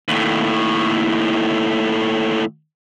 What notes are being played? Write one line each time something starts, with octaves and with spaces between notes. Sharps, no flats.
D#2 A2